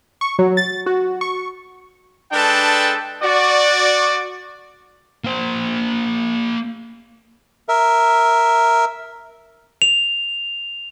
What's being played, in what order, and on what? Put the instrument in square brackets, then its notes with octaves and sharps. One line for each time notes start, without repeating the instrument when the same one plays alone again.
[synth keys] C#6
F#3
A6
F#4
C#6
[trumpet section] G#3 D4 A4 B4 G5 A5
F#4 D5
[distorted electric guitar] A#3 C5
[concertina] A#4 E5
[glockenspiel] F7